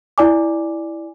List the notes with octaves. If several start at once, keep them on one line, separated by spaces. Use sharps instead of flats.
E4 D5 G#5 D6